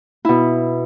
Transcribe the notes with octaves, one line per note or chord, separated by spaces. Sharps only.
B2 E4